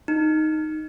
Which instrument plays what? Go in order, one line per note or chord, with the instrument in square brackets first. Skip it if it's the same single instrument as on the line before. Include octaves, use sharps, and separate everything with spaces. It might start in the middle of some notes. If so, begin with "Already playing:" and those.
[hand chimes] D#4